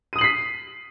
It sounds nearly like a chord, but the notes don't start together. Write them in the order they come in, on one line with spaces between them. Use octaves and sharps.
D#7 D#6 F#7 C7 B6